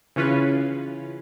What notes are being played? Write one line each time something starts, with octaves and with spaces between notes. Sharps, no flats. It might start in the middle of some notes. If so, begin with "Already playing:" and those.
C#3 E3 C#4 F4 B4